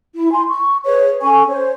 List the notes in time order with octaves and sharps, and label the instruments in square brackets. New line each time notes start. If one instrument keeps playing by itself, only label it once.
[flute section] E4
G#5 C6
C#6
G#4 B4 C#5
C#4 A4 G#5 C#6
C5 C#5